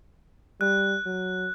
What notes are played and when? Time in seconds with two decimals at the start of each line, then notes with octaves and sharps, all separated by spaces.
0.61 G3 F#6
1.06 F#3